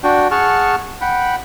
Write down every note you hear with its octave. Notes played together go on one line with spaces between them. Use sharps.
D4 F#4 G5
G#4 F#5 A5 C#6 F6
F#5 G5 B5